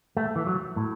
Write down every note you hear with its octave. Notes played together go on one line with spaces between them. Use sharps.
A3
E3
F#3
A2